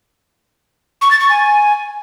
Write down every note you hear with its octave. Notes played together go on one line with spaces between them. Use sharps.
C#6
A6
C#6
G#5